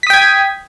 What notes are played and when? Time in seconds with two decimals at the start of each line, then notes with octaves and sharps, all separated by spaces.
0.03 B6
0.07 D#6
0.10 G5
0.13 G#6